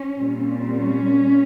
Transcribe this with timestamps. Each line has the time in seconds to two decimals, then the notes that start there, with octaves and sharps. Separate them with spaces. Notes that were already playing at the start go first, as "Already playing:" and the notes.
Already playing: C#4
0.17 A#2 G3 C4
0.72 C#4